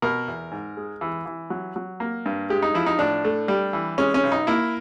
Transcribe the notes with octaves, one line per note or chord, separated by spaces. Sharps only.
B2 A#4
E2
G#2
G#3
E3
E3
F#3
F#3
A#3
G2
G#3 G4
D#4
F3 E4
D#4
A2 D4
A3
G3
E3
G#3 C#4
C#4
B1
D#4
A#3 E4